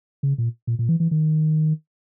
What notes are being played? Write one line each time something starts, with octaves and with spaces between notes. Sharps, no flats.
C#3
A#2
A#2
A#2
E3
E3
D#3